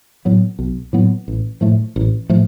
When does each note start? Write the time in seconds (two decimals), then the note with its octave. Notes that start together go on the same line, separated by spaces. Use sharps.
0.25 A2 F#3 B3
0.59 B1
0.93 A2 F#3 B3
1.28 A1
1.61 A2 F3 A3
1.96 A1
2.29 A2 F3 A3